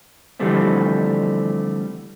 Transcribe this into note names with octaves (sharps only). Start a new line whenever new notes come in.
D3 E3 F3 G3 A3 C4